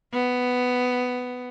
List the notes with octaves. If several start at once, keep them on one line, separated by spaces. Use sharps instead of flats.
B3